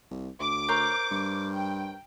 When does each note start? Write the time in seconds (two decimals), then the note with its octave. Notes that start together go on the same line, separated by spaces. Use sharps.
0.11 C2
0.40 D2 D6
0.68 A#4 C5 C#5
1.11 G2
1.54 G5